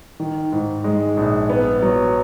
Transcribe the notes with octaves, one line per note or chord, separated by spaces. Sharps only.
D#3
G#2
G#3
A#1
B3
F#3